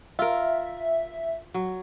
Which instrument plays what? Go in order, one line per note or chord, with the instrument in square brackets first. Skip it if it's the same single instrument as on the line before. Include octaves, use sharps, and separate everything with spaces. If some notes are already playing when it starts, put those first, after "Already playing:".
[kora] F4 A#4 [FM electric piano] E5
[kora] F#3